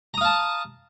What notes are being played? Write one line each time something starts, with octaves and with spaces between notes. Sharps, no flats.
F5 A5 A#5 D#6